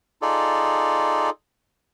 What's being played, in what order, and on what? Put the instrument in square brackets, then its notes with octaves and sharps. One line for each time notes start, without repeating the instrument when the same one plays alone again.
[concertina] D#4 F4 G#4 A4 D5